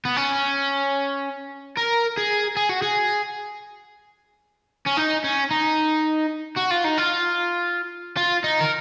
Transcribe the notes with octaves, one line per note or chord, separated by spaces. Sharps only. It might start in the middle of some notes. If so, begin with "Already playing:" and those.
B3
C#4
A#4
G#4
G#4
F#4
G#4
C#4
D#4
C#4
D#4
F#4
F4
D#4
F4
F4
D#4
A#4